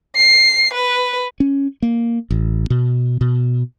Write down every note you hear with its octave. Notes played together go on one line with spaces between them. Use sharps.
C7
B4
C#4
A#3
A1
B2
B2